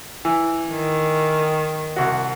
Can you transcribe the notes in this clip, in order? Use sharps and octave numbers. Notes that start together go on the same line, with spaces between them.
E3
D#3
C2 F#4